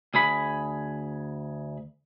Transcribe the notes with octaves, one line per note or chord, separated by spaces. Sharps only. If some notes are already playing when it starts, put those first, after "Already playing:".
D2 G#4 B5